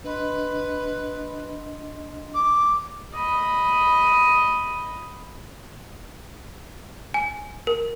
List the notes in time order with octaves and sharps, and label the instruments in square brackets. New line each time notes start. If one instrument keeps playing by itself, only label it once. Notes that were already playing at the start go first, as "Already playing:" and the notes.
[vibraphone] D4 D#5 C6 [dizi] B4
[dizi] D6
[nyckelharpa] D#5 B5
[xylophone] G#5
A#4